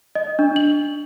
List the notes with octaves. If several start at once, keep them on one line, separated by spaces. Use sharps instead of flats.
D#5
D4
F#7